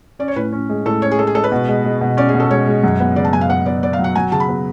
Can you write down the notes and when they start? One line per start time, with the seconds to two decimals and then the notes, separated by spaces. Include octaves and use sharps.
0.19 C#4 D5
0.28 C#5
0.36 A2 B4
0.53 C#4
0.70 G#3
0.85 A2 A4
1.02 C#4 C#5
1.11 G#4
1.19 G#3 A4
1.27 G#4
1.35 G#3 A4
1.44 B4
1.52 B2
1.68 G#3
1.85 G#3
2.01 B2
2.17 C#4 D5
2.29 G#4
2.34 B2
2.40 A4
2.51 G#3 C#5
2.67 G#3
2.83 F#2
3.00 B3
3.16 C#3 D5
3.24 A5
3.33 F#2 G#5
3.41 F5
3.49 B3 F#5
3.66 B3 D5
3.83 B3 D5
3.93 F5
3.99 F#3
4.04 F#5
4.16 F#3 G#5
4.32 C#3 A5
4.40 B5
4.48 B3